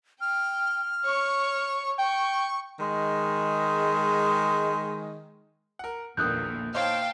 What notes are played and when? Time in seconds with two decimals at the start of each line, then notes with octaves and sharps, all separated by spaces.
0.21 G5 F6
1.05 C#5 C#6
1.99 G5 C#6
2.79 D#3 G#3
5.79 A#4 F#5
6.17 A#1 E2 A#2 D3 D#3 D#6 F#6 G6
6.74 D#4 C5 C#5 F5 G5 A5